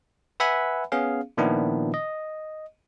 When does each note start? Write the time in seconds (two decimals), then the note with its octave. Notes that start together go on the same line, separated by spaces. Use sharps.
0.40 B4 E5 F#5 G#5 B5
0.92 B3 C#4 G#4 F5
1.37 A#2 D#3 F3 B3 D4 E4
1.94 D#5